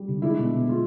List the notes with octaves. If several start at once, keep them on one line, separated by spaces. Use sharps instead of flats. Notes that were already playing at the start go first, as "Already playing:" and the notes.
Already playing: G3
D3
G#3 D4 E4
B2
B2
G#3 F4